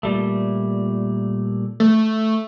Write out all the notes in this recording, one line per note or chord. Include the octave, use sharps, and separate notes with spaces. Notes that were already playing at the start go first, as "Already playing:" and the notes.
A#2 G3 A3
A3